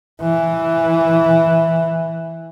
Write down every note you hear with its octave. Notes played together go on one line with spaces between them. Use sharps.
E3